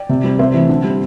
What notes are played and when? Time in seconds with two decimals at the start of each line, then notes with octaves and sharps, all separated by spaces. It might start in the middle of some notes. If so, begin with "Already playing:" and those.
Already playing: D5 G5
0.09 C3
0.24 G3 C4
0.39 C3 C5 E5
0.54 E3 A3 C4
0.69 D3
0.84 G3 C4